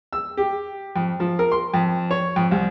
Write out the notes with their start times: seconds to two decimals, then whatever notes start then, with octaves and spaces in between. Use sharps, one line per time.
0.13 E6
0.37 G4
0.96 F2
1.20 F3
1.39 A#4
1.52 C6
1.74 F2
2.11 C#5
2.36 F2
2.51 C2